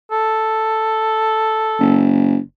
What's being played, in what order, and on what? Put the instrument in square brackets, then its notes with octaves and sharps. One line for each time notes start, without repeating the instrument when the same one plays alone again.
[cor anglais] A4
[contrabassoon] F#1